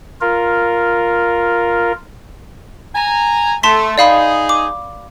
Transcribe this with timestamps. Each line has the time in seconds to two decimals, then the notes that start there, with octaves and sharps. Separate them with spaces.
0.21 F4 A#4
2.95 G#5 A#5
3.63 A3 A5 C6 B6
3.98 D#4 G#4 D5 F5 B5
4.49 D6